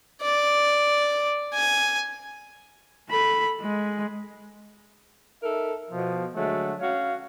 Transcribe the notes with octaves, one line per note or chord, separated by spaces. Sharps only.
D5
G#5
A4 B5
G#3
D#4 A4 A#4 E5
B2 F3
D3 F#3 G#3 A3
C#4 F#4 C#5 F5